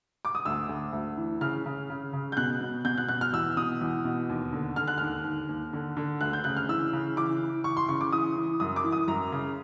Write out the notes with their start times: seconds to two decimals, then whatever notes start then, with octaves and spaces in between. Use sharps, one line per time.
0.25 D6
0.35 D#6
0.45 D2 E6
0.69 D2
0.93 D2
1.17 E3
1.41 C#3 F6
1.66 C#3
1.90 C#3
2.13 C#3
2.32 G6
2.37 B2 F#6
2.61 B2
2.85 B2 G6
2.98 F#6
3.08 B2 F#6
3.21 F6
3.33 E2 E6
3.57 B2 D#6
3.81 E2
4.05 B2
4.30 D#2
4.53 D3
4.76 D3 F6
4.88 F#6
4.98 D#2 F6
5.24 D#2
5.49 D#2
5.73 D3
5.97 D3
6.21 D2 F#6
6.33 G6
6.44 C#3 F#6
6.57 F6
6.69 E3 E6
6.93 C#3
7.16 E3 D6
7.41 E3
7.64 E3 C#6
7.77 C6
7.89 C#3 C#6
8.01 D6
8.12 E3 D#6
8.37 E3
8.60 F#2 D#6
8.76 D6
8.84 E3
8.92 D#6
9.08 F#2 A#5
9.32 C#3